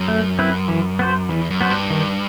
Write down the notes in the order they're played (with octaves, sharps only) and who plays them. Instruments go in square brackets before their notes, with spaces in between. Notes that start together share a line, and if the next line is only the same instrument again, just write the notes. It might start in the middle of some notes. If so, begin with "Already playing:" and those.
Already playing: [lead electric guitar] F#2
[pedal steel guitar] A3
C4 E4 B4
E3
B3 F#4 C5
[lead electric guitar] E2 [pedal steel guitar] E3
[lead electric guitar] F#2
[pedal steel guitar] B3 F#4 C5
[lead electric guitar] G2
[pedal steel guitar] D#3